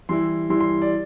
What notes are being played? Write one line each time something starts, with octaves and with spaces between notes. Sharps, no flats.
E3 G3 E4 C6
E3 G3 E4 C6
C6
D5